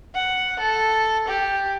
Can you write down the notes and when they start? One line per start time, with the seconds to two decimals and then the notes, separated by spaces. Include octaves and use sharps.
0.15 F#5
0.59 A4
1.28 G4